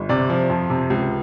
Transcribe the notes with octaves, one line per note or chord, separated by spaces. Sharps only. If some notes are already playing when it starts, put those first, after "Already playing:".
Already playing: G1
C3 D5
F3
F2
C3
C#2